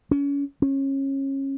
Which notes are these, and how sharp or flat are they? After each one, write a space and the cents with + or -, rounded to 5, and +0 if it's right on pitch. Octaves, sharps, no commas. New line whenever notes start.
C#4 +30
C#4 -25